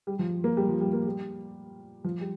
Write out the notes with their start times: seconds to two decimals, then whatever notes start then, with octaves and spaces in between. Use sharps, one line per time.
0.07 G3
0.19 F3
0.44 A#3
0.57 G3
0.69 F3
0.81 G3
0.93 A#3
1.06 G3
2.04 F3
2.21 G3